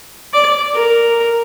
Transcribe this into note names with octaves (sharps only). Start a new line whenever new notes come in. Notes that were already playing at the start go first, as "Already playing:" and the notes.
D5
A#4